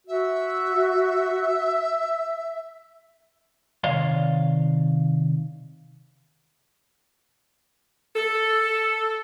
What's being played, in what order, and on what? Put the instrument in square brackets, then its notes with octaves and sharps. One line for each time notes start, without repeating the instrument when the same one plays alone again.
[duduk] F#4 [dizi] E5
[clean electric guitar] C3 D#3 C#5 D5 F5 C6
[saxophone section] A4